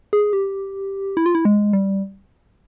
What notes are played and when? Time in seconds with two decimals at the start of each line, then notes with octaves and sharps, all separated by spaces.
0.13 G#4
0.33 G4
1.17 E4
1.26 F4
1.35 E4
1.45 G#3
1.73 G3